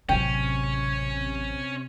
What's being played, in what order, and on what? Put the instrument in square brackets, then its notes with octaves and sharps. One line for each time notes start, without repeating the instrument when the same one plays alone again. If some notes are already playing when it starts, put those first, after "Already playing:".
[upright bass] A1 F#3 [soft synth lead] C3 [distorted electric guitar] C#4 [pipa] G5